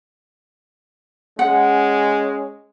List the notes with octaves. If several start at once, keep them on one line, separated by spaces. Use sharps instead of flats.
G#3 C#4 F#5